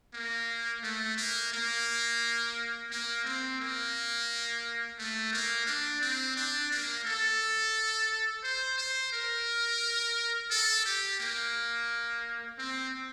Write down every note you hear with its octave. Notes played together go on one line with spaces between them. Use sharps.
A#3
A3
A#3
A#3
A#3
C4
A#3
A3
A#3
D4
C4
D4
A#3
A4
C5
C5
A#4
A4
G4
A#3
C4